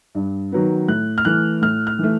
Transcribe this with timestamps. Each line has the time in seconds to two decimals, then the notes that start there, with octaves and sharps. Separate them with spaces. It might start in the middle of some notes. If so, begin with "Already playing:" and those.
0.15 G2
0.52 D#3 F#3 B3
0.88 A2 F#6
1.18 F6
1.25 E3 A3 F#6
1.62 A2 F6
1.87 F6
1.99 E3 A3